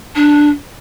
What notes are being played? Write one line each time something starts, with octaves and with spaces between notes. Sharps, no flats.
D4